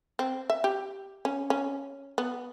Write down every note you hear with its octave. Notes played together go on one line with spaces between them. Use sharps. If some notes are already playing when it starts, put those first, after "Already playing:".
C4
E5
G4
C#4
C#4
B3